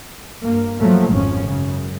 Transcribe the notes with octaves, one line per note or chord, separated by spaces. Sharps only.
G2 A#3
F3 F#3 A3 A#3
G#1 F2 F3 C#4
F#2 C#3